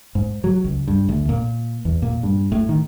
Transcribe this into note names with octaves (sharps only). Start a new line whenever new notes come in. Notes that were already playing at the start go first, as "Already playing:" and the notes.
G#2
F#3
C#2
G2
D2
A#2
E2
A#2
G2
A2
D#3